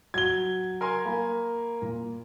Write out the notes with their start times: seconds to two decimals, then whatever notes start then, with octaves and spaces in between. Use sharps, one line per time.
0.14 F#3 G#6 G7
0.81 A#4 G#5 C6
1.05 A#3 F5 B5
1.82 A#2